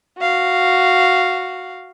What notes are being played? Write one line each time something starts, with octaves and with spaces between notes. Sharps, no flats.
F#4 F5